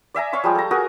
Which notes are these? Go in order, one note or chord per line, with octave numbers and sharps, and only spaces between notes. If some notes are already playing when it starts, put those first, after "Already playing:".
D5 E5 G#5 A#5
C#5 F5 C6 C#6
F3 G3 G#3 G4
A4 A#5
F#4 G#4 A#4 G#5